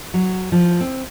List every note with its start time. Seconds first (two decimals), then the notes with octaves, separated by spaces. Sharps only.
0.14 F#3
0.52 F3
0.81 C4